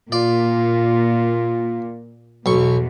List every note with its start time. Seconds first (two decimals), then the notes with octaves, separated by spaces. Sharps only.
0.12 A#2 F4 D5
2.46 B1 E2 B2 C#6